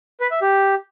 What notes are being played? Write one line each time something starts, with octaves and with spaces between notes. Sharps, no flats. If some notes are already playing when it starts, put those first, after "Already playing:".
B4
E5
G4